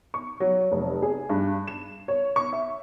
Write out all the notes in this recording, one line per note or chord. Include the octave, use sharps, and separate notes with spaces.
C#6
F#3
F1
G#4
G2
E7
C#5
C#6
E5